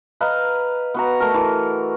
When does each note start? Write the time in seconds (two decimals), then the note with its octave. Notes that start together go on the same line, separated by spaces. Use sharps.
0.21 B4 D#5 F5 A#5
0.94 B3 F#4 A#5
1.20 A3 A#4
1.34 E3